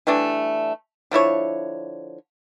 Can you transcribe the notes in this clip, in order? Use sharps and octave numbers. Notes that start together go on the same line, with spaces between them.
E3 G3 A3 D4
D3 F3 E4 C#5